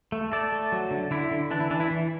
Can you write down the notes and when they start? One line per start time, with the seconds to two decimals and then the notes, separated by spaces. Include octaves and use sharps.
0.12 A3
0.32 A3 A4 D5
0.52 A3
0.72 F#3
0.91 D3
1.11 D3 E4
1.31 D3
1.51 E3 D4
1.60 E4
1.70 E3 D4
1.80 E4
1.91 E3